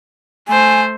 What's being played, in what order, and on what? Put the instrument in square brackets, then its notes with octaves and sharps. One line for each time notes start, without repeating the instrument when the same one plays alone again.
[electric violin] A3 C5 [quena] G#5